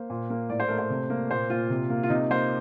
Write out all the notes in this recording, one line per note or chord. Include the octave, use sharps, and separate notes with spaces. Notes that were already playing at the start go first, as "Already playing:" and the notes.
Already playing: A#3 C5
A#2
A#3
A2 D5
C5
A3 A#4
C5
C3
A#3
A#2 C5
A#2 F4
C3
A#3
F4
C3 D#4
A#3 C5